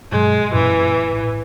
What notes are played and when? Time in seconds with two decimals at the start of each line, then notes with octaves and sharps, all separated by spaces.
0.12 G2 B2 F#3 G#3
0.54 F#2 A#2 E3 C#4
1.12 A1